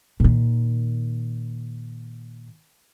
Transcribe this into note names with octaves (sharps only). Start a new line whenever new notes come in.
A#2 D#3